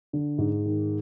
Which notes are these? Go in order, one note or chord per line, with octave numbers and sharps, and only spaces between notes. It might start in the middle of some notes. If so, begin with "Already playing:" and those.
D3
G#2
D#3